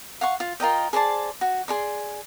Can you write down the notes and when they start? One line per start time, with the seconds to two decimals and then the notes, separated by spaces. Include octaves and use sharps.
0.21 F5 F#5 C#6
0.40 F4
0.60 F4 A#4 D#5 G5
0.93 G#4 C5 D5 A5
1.41 F#4
1.68 G#4 D5 C6